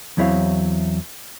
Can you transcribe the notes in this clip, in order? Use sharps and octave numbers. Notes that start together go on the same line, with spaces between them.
E2 F#3 C4 E4 C#5 F5